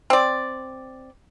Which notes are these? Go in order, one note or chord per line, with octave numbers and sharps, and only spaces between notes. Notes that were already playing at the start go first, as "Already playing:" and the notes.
C4 D5